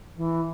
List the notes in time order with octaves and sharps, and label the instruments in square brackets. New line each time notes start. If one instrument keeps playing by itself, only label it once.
[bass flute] E3